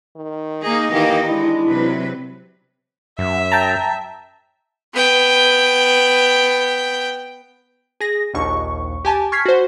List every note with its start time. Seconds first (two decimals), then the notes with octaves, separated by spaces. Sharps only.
0.16 D#3
0.62 A#3 D#4 G#4 D#5
0.92 D#3 E3 A#3 G4
1.28 G#3 D4 E4
1.67 C3 F#3 B4
3.19 F#2 E5
3.52 G5 A5 A#5
4.94 B3 G5
8.00 G#4 A#6
8.34 A#1 D#2 C#6
9.05 G4 G#5 A5
9.32 C#6 F6 G#6 B6 C7
9.45 F#4 C5